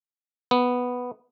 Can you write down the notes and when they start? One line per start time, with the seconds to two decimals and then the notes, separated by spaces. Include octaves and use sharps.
0.51 B3